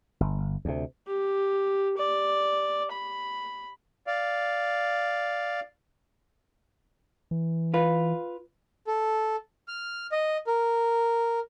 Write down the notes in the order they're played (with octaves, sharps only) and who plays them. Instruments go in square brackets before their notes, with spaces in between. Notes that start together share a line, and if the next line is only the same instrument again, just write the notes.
[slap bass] G1
D2 C3
[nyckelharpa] G4
D5
B5
[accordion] D5 F5
[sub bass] E3
[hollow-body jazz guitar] F4 B4
[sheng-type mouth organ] A4
F6
D#5
A#4